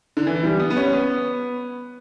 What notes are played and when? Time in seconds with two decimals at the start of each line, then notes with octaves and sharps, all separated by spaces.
0.17 D3
0.27 E3
0.43 G3
0.60 B3
0.70 B3
0.77 C#4
0.93 B3